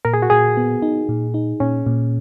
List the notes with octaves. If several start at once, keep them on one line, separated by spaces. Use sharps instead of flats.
A#2 A#4
G#4
F#4
A#2 G#4
B3
D#4
A#2
D#4
A#2 C#4
A#2